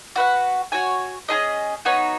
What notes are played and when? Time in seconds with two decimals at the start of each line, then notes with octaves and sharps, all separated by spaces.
0.16 F#4 B4 F#5
0.72 F#4 C#5 G#5
1.28 C#4 E4 G#4 D#5
1.85 B3 D#4 F#4 C#5